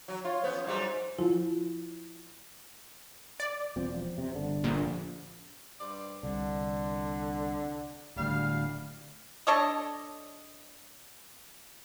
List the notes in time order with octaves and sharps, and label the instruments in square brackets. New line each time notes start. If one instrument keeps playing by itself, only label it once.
[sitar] F#3
[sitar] F4 [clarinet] C#5
[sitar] B3 C#4 [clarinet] C5
[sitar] G#2 F#3 G3
[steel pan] F3 [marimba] E4
[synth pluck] D5
[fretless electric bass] E1 F3 C4
C3
G1 D3
[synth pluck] A#1
[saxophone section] G2 C5 D5
[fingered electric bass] C2 [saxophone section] D3
[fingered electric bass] D1 D2 [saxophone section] G3 F5
[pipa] D4 A4 C#5 D#5